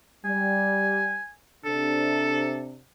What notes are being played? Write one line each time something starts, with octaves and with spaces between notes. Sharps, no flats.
G3 G#5
C3 D4 A4